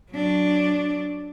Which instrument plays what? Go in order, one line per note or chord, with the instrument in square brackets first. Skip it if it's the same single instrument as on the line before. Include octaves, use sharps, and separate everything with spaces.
[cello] F#3 D4